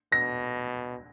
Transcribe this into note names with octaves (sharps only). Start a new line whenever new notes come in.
B2 A#6